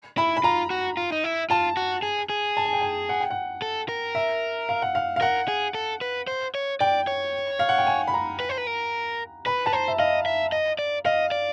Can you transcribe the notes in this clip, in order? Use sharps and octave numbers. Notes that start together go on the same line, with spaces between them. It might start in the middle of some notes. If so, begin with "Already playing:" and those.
E4 B5
B5
F4 A#5
F#4
F4
D#4
E4
F4 A5
F#4
G#4
G#4
A5
G#5
G5
G#5
F#5
G5
F#5
A4
A#4
E5
F5
F#5
F5
F5
A#4 F#5
G#4
A4
B4
C5
C#5
D5 G5
C#5
F5
F#5
G5
G#5
B5
A#5
B4
C5
B4
A#4
B4 B5
B4 A5
C5 A#5
E5
D#5 F5
E5
D#5
D5
D#5 F5
D5